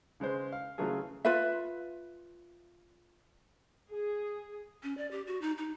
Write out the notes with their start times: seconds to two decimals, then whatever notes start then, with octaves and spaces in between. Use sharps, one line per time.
0.20 C#3 G#3 B4 C5
0.52 F5
0.78 C#3 E3 F#3 A3 F4 G#4
1.25 F4 B4 E5
3.92 G#4
4.83 C#4
4.98 D5
5.11 G4
5.27 F#4
5.42 D#4
5.58 D#4